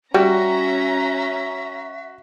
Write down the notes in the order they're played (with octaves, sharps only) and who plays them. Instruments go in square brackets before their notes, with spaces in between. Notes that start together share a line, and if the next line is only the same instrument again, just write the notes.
[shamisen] G3 [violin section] C#4 A#5 [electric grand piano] F#4 [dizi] E5